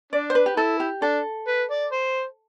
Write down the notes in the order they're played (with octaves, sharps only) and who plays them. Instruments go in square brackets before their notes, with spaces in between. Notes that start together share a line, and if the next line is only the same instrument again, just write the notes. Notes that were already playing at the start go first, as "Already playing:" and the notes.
[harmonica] D4 [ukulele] D5
[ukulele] C5
B4
G4
[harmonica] E4 [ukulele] A4
[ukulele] G4
[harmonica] D4 [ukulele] A4
[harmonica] B4
D5
C5